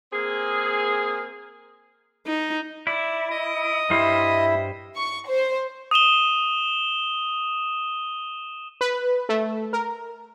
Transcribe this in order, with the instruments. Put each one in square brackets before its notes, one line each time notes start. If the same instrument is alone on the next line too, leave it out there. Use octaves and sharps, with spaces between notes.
[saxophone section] A#3 C4 G#4
[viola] D#4
[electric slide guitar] E4 [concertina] D5
[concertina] D#5 D#6
[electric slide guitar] G2 G3 C5 [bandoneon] E4 [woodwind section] E5
[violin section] C#6
C5
[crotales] D#6 D#7 E7 G7
[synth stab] B4
A3
A#4